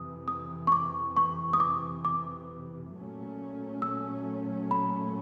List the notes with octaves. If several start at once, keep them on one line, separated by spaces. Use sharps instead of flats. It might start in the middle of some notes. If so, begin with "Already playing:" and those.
Already playing: F2 C3 E3 D#6
D#6
C#6
D6
C#6
D#6
D6
D6
A#2 F#3 A3 C#4
E6
B5